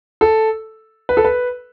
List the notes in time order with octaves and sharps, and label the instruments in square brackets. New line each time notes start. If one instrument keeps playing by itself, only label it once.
[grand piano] A4
B4
A4
B4